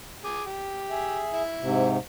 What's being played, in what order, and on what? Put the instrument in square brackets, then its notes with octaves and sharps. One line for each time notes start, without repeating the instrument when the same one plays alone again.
[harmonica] G#4 D6
G4
[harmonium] G#4 E5
[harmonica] E4
[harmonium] G#2 C3